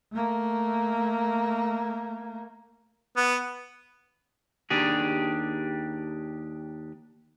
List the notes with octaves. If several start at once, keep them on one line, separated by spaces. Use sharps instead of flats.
A3 A#3
B3
D#2 D4 G4 G#4